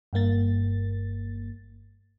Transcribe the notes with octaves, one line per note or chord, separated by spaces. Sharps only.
G1 G2 A#3 A6